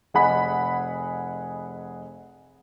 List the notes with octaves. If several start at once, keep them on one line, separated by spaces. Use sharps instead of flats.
F1 G#4 D#5 F#5 B5 B6